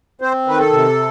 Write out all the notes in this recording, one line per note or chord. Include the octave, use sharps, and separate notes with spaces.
C4 C5
D#3 B4
A4
C3